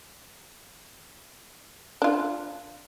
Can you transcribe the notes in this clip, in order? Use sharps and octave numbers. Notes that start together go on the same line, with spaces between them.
D4 F4